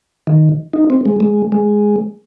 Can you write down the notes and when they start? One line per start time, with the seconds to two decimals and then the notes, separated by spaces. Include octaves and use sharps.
0.27 D#3
0.73 D#4
0.90 C4
1.05 G#3
1.20 G#3
1.52 G#3